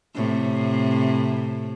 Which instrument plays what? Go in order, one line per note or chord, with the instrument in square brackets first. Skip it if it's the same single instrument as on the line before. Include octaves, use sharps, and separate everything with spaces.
[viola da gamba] A2 C3